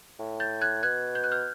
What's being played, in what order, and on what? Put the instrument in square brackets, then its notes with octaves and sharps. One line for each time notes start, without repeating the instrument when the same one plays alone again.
[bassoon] A2
[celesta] G6 A6
F#6 G#6
[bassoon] B2 [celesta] F#6 G#6
[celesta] G6
F#6
F6 G6